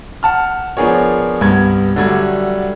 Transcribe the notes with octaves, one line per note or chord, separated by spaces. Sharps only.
F#5 A5 F6
F3 B3 D4 G#4 A#4 C#5
C2 G2 B3 G#6
D3 F#3 G3 A3 G#6